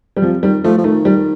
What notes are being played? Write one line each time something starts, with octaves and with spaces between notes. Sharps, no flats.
G3
C3 F3
D#3 G3
F3 A3
F3
D#3 A3
G3